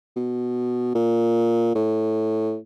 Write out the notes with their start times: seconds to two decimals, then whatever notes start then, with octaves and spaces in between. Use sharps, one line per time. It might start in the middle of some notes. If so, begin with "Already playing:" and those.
0.16 B2
0.95 A#2
1.75 A2